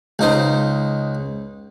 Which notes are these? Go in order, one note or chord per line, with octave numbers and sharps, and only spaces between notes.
C#2 D#4 C5